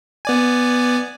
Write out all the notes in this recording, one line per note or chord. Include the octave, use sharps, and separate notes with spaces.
B3 D5 G#5